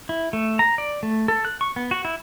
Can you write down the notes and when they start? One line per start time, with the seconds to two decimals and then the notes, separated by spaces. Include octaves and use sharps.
0.09 E4
0.33 A3
0.59 A#5
0.78 D5
1.03 A3
1.28 A4
1.45 F#6
1.61 C#6
1.76 B3
1.91 F#4
2.05 E4